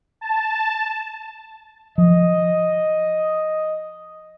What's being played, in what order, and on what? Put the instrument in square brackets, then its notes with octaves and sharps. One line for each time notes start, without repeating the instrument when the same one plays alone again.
[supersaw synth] A5
[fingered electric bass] F3 [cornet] D#5